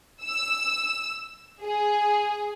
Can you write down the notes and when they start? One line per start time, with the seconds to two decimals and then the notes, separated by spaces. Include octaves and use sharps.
0.22 E6
1.62 G#4